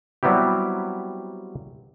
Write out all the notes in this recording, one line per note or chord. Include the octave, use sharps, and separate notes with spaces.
F#3 G3 B3 C4 E4 G4